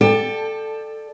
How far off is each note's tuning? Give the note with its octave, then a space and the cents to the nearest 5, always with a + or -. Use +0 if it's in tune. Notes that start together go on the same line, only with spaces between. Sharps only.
A4 +0 D5 +25 G5 +25